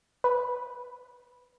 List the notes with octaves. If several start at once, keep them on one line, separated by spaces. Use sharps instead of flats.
B4